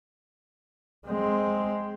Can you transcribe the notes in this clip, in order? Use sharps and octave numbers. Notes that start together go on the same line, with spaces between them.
G#3 C4